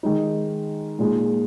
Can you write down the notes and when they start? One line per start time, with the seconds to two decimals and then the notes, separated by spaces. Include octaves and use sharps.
0.03 D#3 G#3 D#4
0.99 A#2 G#3 D#4